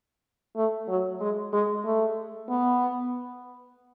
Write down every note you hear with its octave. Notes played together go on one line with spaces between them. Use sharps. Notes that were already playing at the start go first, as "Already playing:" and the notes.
A3
F#3
G#3
G#3
A3
B3